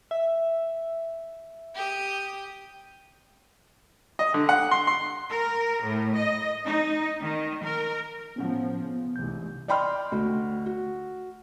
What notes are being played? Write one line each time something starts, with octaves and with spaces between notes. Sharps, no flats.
E5
G4 D#6
D#5
D3
F#5
C6
C6
A#4
A2
D#5
D#4
D#3
A#4
A2 F3 B3 C#4 F#5
C#3 B3
F1 C2 G#2 E3 G6
D5 D#5 G5 B5 C6 F6
D2 F#4
F#4